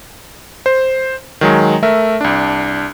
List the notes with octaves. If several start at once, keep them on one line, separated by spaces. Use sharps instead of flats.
C5
D#3 F#3 G#3
A3 A#4 E5
C2 D4